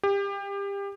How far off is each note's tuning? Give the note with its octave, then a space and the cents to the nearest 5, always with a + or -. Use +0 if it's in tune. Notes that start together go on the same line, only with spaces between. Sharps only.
G4 +25